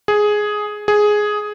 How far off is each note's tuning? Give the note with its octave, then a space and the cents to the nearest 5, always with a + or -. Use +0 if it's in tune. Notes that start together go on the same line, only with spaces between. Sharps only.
G#4 +5
G#4 +5